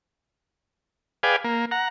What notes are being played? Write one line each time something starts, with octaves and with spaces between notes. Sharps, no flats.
G#4 B4 D5 F5 G5 G#5
A#3
F#5 A#5